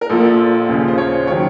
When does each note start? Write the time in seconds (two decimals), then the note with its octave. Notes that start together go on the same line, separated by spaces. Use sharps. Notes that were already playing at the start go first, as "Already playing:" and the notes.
0.01 A#4
0.10 A#1 A#2 F3 A4
0.69 D#2 C#3 F3
0.88 C5
0.98 C#5
1.27 D#3 F#3 C#5